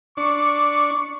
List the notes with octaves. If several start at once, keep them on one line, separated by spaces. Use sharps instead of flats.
D4 C#6